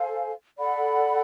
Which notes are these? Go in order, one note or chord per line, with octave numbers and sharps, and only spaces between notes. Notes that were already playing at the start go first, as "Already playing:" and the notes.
Already playing: A4 C5 F5 G#5
A4 D5 F#5 B5